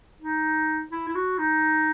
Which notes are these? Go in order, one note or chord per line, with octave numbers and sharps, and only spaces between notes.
D#4
E4
E4
F#4
D#4